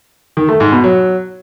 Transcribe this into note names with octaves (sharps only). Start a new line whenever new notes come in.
D#3
A3
G#2
B2
F#3